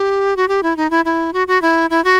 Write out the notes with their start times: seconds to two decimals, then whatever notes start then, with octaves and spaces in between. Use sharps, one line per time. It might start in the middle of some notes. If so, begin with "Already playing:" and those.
Already playing: G4
0.37 F#4
0.48 G4
0.63 E4
0.77 D#4
0.90 E4
1.05 E4
1.33 F#4
1.48 F#4
1.62 E4
1.90 E4
2.04 F#4